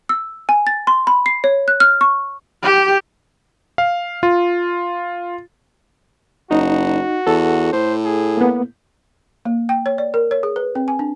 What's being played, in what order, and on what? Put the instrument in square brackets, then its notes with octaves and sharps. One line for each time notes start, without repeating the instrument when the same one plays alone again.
[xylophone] E6
G#5
A6
C6
B5
C7
C#5
F#6
F6
C#6
[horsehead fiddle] G4
[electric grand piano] F5
F4
[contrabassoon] F#1 [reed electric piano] D#4 [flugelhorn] F#4
[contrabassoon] E2 [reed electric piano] A4
[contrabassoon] A2 [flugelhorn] C5
[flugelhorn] G#4
[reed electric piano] A#3 B3
[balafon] A#3
G5
C#5
D5
A#4
C#5
G#4
B4
C4
G#5
D4